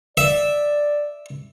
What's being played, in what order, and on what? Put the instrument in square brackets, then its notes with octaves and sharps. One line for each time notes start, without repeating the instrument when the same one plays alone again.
[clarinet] D5 [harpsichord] E5